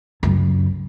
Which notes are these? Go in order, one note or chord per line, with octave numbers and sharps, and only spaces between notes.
C#2 F#2